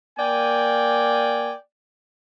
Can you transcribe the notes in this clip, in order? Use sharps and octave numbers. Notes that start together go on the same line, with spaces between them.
A#3 D5 G5 G#5